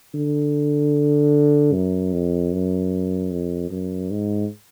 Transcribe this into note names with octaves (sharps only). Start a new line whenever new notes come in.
D3
F#2
F2
F#2
F2
F#2
G#2